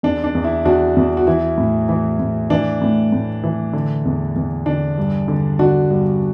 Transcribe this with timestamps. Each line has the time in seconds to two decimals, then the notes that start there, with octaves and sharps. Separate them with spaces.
0.03 E2 D4
0.24 D4
0.35 E2
0.44 E4
0.65 E2 D4 F#4
0.96 E2
1.17 F#4
1.27 E3 E4
1.58 A2
1.89 E3
2.19 A2
2.50 E3 D4
2.82 A2
3.12 A2
3.44 E3
3.73 D3
4.05 E2
4.36 E2
4.66 D3 D4
4.98 G2
5.28 D3
5.59 D3 D4 F#4
5.90 G2